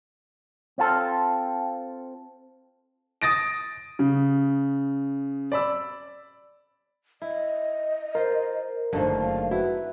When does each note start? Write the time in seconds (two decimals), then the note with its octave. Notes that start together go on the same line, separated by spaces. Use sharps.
0.78 C4 F4 A4
3.22 D#6 A6 A#6 D7
3.99 C#3
5.52 D5 B5 E6
7.22 E4 D#5
8.15 F4 A#4 C5
8.93 F#1 D3 D#3 F3 A3 F5
9.51 E4 F#4 B4